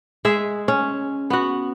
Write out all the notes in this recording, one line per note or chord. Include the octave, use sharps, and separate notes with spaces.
G#3 G#4 E5
C#4
B3 F#4